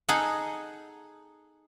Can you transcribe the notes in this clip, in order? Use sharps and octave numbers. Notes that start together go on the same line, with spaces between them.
D#4 G#4 A4 F#5